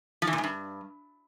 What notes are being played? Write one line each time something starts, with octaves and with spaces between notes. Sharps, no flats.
F3
E3
A#2
G#2
G2